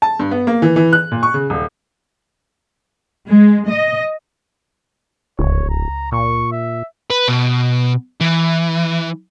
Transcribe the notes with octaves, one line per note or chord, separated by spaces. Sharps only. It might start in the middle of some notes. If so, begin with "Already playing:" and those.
A5
G2
B3
A#3
E3
E3
F#6
A#2
C#6
C#3
D#1
G#3
D#5
D1 C#2 C#5
A#5
A#2 C#6
E5
B4
B2
E3